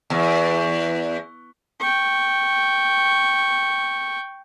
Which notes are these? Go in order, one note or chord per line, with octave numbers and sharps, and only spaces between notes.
E2
G5 C#6